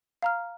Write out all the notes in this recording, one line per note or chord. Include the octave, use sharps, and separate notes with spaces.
F5 A#5 F6